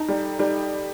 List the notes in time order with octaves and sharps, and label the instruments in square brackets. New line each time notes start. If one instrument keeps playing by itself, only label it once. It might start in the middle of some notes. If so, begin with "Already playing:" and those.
Already playing: [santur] D#4 A4
[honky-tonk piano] G3
[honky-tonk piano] G3 [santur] D#4